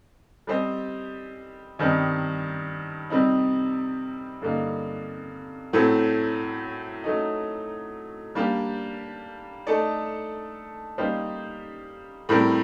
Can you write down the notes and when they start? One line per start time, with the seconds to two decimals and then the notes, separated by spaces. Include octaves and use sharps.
0.47 G3 C4 G4 C5 D#5
1.79 G2 D#3 G3 C4 D#4
3.10 C3 G3 C4 D#4
4.41 G2 D3 G3 A#3 D#4
5.73 A2 F#3 A3 C4
7.04 F#3 A3 D#4
8.35 G3 A#3 D4 G4
9.67 A3 D#4 A4 D5
10.98 G3 A#3 D#4 G4 C5
12.29 A2 G3 C4 G4 A#4